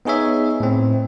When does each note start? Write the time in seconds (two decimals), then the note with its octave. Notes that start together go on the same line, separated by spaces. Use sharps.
0.05 B3 D#4 G#4 C#5 E5
0.60 A2 C4